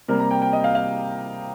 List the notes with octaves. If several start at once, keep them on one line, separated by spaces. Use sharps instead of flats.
C3 G3 A#3 A#4
A#5
G5
G5
D#5
F5
F5